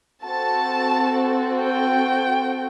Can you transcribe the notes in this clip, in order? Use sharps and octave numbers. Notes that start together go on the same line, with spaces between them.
C4 F#4 A4 A5
G5